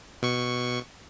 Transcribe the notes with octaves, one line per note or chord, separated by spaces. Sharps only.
B2 C#6